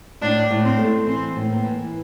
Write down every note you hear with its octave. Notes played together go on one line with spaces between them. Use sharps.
A2 D4
A2
C4
A3
E3 C4
A2
A#3
E3